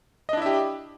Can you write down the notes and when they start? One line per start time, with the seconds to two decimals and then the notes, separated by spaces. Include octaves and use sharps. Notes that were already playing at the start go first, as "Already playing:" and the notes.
0.29 D#5
0.33 D4
0.37 E4
0.42 E5
0.46 G4